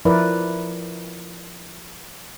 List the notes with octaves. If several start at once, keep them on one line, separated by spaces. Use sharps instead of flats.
F3 E4 A#4 B4 D5